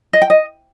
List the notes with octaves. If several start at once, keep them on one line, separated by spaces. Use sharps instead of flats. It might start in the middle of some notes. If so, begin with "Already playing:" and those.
D#5
G5
D#5